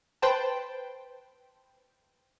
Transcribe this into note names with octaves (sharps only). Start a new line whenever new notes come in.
B4 C5 G5 A5